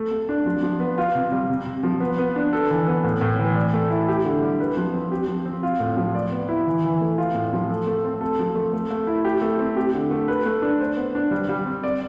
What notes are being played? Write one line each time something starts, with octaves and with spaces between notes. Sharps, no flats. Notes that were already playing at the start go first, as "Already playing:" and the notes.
Already playing: A3
A3
D4
F3
F3
B3
F4
C3
G3
C3
C3
F3
B3
B3
D4
A4
E3
B3
A2
A2
E3
D5
A3
E4
G4
D3
G3
B4
F3
C4
G4
F3
C4
F4
A2
F3
D5
B3
E4
E3
E3
A3
F4
A2
F3
A4
A3
C4
A4
F3
A3
A3
A3
E4
G4
A3
C4
G4
D3
A3
B4
A3
D4
C5
B3
D4
G3
G3
C4
D5